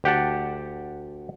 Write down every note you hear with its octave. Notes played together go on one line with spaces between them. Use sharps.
D2 G4 F#5 A5